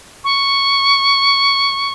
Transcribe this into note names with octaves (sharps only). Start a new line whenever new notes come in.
C#6